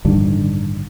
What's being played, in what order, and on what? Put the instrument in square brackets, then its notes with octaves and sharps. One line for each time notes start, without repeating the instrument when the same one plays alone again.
[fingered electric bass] A1 G2 D3 D#3